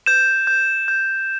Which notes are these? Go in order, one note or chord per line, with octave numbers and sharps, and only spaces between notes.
G6 E7
G6
G6